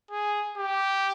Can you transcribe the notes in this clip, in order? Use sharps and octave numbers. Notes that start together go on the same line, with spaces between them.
G#4
G4